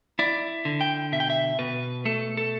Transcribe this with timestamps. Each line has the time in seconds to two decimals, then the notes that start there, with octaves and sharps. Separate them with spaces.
0.19 E4 D5
0.65 D3
0.81 G5
1.12 B2 E5
1.20 G5
1.30 E5
1.59 B2 B4
2.05 A3 A4
2.37 A4